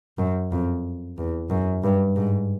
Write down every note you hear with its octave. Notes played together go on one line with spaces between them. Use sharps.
F#2
F2
E2
F#2
G2
G#2